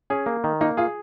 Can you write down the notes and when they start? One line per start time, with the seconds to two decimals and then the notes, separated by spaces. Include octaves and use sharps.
0.10 C#4 G#4
0.26 A#3
0.44 D#3
0.61 A#3 D#4
0.77 F4 G#4